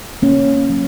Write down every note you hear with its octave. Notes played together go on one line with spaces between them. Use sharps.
C#3 A#3 C#4
F#3